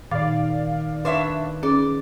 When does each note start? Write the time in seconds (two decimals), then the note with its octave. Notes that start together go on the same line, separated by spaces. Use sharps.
0.11 A#2 D#3 D5 F5 D6 A6
1.05 D4 B4 C#5 E5 C6
1.63 C#4 G#4 D5